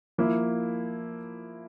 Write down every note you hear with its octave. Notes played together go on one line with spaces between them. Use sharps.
F3 A#3 E4